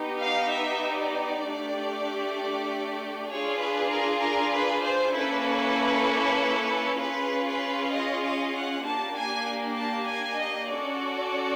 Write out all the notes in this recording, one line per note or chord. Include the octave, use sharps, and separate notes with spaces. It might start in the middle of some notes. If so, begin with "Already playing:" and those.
Already playing: B3 D#4 G4
F5
E5
D5
A3 D4 G4
D4 F4 G#4 C#5
B4
A#4
A#4
B4
C5
A#3 C#4 E4 A4 B4
C#4 F4 G#4 B4
B4
D#5
D#5
F#5
A#3 D4 G4 A5
G#5
A5
G#5
D#5
C#4 F#4 A4 D5